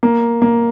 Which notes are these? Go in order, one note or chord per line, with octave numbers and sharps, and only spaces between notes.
A#3
A#3